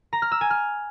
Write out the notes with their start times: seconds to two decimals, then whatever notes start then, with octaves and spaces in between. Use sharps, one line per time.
0.13 A#5
0.22 F6
0.32 E6
0.41 G#5
0.50 F6